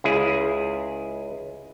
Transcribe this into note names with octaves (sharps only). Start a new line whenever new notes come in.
C#2 E4 G#4